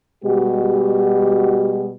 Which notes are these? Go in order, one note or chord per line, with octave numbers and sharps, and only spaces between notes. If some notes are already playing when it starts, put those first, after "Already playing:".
B2 G3 G#3 F#4 G4